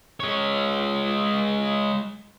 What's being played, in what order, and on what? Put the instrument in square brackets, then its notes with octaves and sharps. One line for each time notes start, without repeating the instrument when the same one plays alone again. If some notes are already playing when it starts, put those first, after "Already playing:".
[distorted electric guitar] G#3 C#5